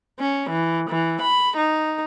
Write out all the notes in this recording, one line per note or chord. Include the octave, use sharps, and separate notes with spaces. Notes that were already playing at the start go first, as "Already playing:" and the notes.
C#4
E3
E3
B5
D#4